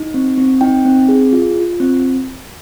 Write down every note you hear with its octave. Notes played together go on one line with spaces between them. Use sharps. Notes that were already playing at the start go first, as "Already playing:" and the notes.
Already playing: D#4
C4
C4
D#4 G5
C4
G#4
F4
F4
C4